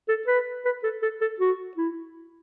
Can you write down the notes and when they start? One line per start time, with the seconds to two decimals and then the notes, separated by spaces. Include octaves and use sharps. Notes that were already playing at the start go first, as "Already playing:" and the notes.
0.08 A4
0.27 B4
0.65 B4
0.83 A4
1.02 A4
1.21 A4
1.40 F#4
1.77 E4